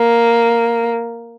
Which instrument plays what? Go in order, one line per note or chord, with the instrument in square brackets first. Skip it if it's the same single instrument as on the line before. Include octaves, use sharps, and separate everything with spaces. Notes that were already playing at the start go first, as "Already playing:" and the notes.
Already playing: [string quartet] A#3